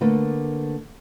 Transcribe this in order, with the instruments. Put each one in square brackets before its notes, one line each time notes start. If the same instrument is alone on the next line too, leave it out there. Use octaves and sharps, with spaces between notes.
[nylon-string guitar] D3 A3 A#3 B4